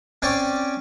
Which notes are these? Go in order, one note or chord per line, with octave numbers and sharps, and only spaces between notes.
C4 C#4 C#5 D5